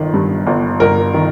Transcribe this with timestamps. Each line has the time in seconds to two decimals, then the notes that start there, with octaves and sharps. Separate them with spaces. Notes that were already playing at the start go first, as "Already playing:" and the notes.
Already playing: G1 D#3
0.14 G2
0.47 G1
0.80 G1 A#4
1.14 D#3